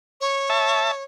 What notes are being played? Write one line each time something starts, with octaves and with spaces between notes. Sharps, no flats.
C#5
E5 A5